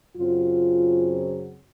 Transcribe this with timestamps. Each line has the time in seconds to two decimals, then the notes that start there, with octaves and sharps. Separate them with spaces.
0.16 F#2 C#3 F#3 C4 F4